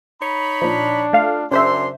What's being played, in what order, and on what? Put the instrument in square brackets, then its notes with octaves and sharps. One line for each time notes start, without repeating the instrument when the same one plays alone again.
[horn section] D#4 C#5 B5
[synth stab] A#2 F3 [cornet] D4
[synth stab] A3 F4 F5
[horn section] F#2 D4 C6 [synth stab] C#3 C5 E5